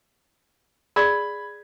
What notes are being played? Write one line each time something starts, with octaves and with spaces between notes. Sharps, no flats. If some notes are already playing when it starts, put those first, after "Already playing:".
G#4 D5 B5 G#6